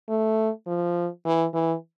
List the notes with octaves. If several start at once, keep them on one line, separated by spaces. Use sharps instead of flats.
A3
F3
E3
E3